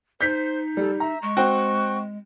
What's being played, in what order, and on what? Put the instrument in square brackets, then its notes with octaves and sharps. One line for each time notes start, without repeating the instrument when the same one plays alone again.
[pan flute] D#4 [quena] C5 [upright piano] G6 B6
[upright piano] G3 [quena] A4
[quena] E5 [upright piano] A#5
[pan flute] G#3 [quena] C#6
[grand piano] C4 F#4 [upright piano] G5